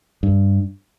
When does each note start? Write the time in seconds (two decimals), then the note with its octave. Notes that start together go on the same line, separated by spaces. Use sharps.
0.23 G2